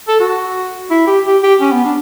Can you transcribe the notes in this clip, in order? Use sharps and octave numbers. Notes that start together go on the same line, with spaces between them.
A4
F#4
E4
G4
G4
G4
C#4
B3
D4